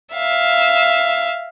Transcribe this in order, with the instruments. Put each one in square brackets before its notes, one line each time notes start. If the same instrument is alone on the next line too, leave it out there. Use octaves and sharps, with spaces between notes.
[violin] E5 F5